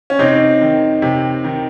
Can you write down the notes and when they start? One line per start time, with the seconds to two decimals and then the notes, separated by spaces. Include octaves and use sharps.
0.10 C#4
0.19 C3 C4 D#4
0.61 D#3
1.02 C3
1.44 D#3